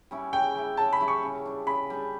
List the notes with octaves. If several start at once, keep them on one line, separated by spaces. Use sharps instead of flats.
G3 C#4 E4
C#3 G5
G3 C#4 E4
C#3 A5
B5
G3 C#4 E4
C#6
C#3
G3 D4
C#3 B5
G3 D4